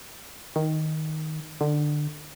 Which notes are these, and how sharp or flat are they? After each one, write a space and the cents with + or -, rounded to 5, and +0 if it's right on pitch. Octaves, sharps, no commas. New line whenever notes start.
D#3 +5
D3 +20